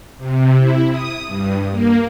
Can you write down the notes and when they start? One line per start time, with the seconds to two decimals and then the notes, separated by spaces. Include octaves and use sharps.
0.18 C3
0.58 E4
0.91 D#6
1.27 G2
1.71 A#3